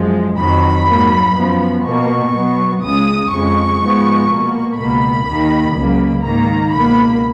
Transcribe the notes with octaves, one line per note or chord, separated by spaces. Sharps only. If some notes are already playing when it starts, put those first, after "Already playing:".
Already playing: F#2 F3 G#3
F2 D#3 F#3 B5
G#2 F#3 A#3
F#2 F3 B3
B2 A#3 C#6
B2 F#3 B3
C#2 C#3 G#3 D#6
F2 C#3 G#3 C#6
G#2 F3 G#3 B3
B2 A#3
C#2 B2 A#3 B5
D#2 D#3 A#3
C#2 C#3 F#3 A#3
G#2 D#3 A#3 A#5
C#2 B2 A#3 B5